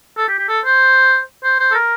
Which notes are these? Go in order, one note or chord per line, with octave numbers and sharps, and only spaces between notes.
A4
G4
G4
A4
C5
C5
C5
A4
A#4